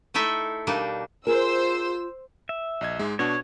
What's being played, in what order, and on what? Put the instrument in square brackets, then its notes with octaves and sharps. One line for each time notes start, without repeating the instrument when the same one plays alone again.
[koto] A3 D#4 E4 A4 E5
B2 G3 A#3 D4 D#4
[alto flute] F4 [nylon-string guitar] G#4 A#4 [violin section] C5 E6
[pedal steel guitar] E5
[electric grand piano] A#1 D#5 G#6
G#2 G#3
[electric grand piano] B2 D4 F#4 [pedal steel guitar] C#5